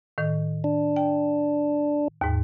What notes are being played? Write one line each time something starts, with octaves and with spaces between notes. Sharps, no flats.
A2 D#3
D4
G5
D#2 G#2